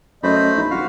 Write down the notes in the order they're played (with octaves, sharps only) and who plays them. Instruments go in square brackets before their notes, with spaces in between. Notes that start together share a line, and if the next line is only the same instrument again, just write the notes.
[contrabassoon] F#2 [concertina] A3 C5 B5 [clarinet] D#5
[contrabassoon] A#1 [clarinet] D#4
[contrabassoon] D#1 [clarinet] F4 [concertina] F#4 F5